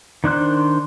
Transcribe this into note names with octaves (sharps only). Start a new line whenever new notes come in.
D#3 D4 C5 F#6